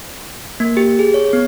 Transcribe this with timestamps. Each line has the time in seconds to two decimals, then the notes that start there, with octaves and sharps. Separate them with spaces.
0.60 A#3
0.77 G4
0.99 G#4
1.14 C#5
1.33 B3